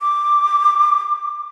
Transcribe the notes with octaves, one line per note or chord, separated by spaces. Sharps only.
D6